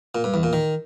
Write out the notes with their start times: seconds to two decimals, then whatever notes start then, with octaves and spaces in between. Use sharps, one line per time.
0.15 A#2
0.24 G2
0.34 E2
0.43 A#2
0.53 D#3